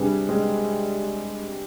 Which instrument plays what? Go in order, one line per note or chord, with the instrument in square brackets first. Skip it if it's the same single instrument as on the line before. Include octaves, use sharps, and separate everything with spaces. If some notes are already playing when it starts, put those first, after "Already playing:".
Already playing: [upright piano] C3 G3 D4 G#4 B4
[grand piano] G#3 C4